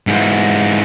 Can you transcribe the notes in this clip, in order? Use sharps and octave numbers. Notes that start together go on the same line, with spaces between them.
G#2 E3